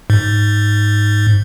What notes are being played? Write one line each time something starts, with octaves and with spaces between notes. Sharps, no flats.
G#2